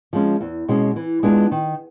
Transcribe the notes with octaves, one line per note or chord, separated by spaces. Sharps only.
F3 G#3 C#4
E2
B2 G#3 C#4
E3
G#3 B3 D4 F4
D#3